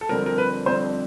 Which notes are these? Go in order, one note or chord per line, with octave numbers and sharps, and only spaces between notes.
A4
F2 D3 G3 C4 A#4
A#4
B4
F2 D3 G3 C4 C5